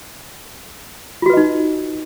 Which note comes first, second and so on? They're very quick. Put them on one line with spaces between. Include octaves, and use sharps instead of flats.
F4 F#4 B4 D#5 D#4